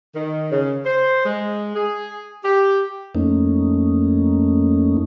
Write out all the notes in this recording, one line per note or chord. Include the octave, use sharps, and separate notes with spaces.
D#3
C#3
C5
G#3
G#4
G4
F2 A3 A#3 C#4 D#4